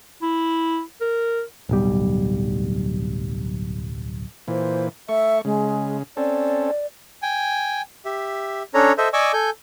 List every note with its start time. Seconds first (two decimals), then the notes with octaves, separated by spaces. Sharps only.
0.22 E4
1.01 A#4
1.69 D1 B1 G3
4.48 A#2 E3 C5
5.09 A3 E5 C#6
5.45 C#3 G#3
6.17 C4 C#4 A4 D5
7.22 G5 G#5
8.05 G4 E5
8.74 C#4 D4 A4 C#5 A#5
8.98 A4 C5 D#5 E5
9.13 D5 D#5 G#5 C#6 D6 E6
9.33 A4 G#5 G6